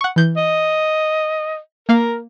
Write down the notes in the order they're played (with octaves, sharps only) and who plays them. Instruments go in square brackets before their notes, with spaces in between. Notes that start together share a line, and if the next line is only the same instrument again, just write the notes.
[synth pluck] F#5 C#6
E3 G6
[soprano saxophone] D#5
[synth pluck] A#3 F5 [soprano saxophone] A#4